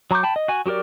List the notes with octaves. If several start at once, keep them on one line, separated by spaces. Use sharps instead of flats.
F#3 A#5 C#6 D6 G6
G5 A5 B5
D#5
F#4 G#5
F#3 F#4 G4 A#4 D5